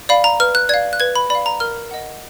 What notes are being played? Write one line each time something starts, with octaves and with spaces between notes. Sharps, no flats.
D5 F5 B5
A#5
B4 F6
F#6
D5 F5 G#6
F#6
B4 G#6
B5
D5 F5 B5
A#5
A#4 F6
D#5 F#5